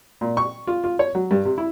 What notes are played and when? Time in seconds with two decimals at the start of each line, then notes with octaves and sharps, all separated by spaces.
0.21 A#2
0.37 C#6
0.67 F4
0.84 F4
0.99 C#5
1.15 F#3
1.31 G2
1.45 C3
1.58 E4